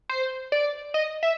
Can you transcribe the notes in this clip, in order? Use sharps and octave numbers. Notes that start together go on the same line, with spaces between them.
C5
D5
D#5
E5